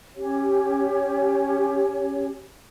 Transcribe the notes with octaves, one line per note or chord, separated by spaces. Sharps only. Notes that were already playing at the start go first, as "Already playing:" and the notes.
C#4 G4 C#5